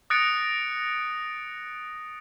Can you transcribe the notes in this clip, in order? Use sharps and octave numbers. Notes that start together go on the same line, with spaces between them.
D#6 F#6 A6 A#6 C#7 D7